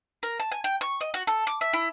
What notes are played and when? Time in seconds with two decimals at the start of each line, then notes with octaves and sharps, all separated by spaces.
0.23 A#4
0.40 A5
0.52 G#5
0.64 G5
0.81 C#6
1.01 D#5
1.14 F#4
1.27 A4
1.47 D6
1.61 E5
1.73 E4